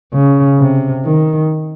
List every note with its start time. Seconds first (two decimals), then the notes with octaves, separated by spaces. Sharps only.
0.13 C#3
0.59 C3
1.05 D#3